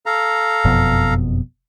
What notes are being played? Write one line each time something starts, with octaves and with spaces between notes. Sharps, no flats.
A4 F5 A#5
F#1 F2 B2